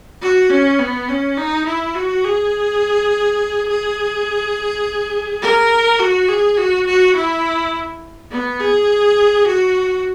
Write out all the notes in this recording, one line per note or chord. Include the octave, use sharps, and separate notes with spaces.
F#4
C#4
B3
C#4
D#4
E4
F#4
G#4
G#4
A#4
F#4
G#4
F#4
F#4
E4
B3
G#4
F#4